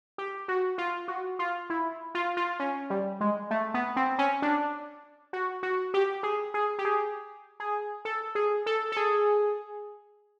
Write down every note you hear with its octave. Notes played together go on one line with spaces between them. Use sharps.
G4
F#4
F4
F#4
F4
E4
F4
F4
C#4
G3
G#3
A3
B3
C4
C#4
D4
F#4
F#4
G4
G#4
G#4
G4
G#4
G#4
A4
G#4
A4
A4
G#4